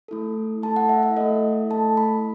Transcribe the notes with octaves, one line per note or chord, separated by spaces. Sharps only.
A3 E4 A4
A3 E4 A4 A5
F#5
E5
E5
A3 E4 A4 D#5
A3 E4 A4 A5
B5